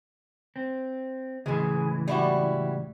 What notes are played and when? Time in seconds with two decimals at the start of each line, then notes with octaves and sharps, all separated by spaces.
0.56 C4
1.46 C#2 A2 E3 G#3 G#4
2.08 G3 E4 F#4